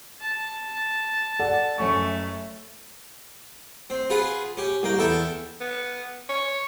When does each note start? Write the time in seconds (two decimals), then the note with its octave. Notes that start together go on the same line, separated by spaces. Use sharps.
0.20 A5
1.39 A4 D5 F#5
1.78 F#1 A3 C#4 C#6
3.90 C4
4.10 F4 G#4 B4 F#5
4.57 C#4 G4
4.83 C2 A#3 G5
4.98 E2 E4 A4 G5
5.61 B3
6.29 C#5